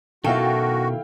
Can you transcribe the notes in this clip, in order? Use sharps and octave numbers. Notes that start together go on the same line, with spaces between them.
B2 D#3 E4 F#4 A4 F5 G5